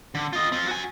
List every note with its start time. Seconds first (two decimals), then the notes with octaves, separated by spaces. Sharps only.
0.15 D3
0.33 F4 D#5
0.52 C4 F4
0.67 F#4 G#5